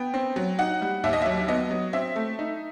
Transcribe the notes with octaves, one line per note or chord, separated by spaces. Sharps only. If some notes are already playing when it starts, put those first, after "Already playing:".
Already playing: B3 G5
C4
F#3
D#4 F#5
G3
D#2 E5
D#5
F#3 E5
B3 D#5
F#3
C4 E5
A3
D#4